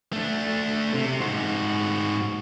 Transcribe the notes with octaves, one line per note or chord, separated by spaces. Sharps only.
A3 D4
C3
G#2 F#4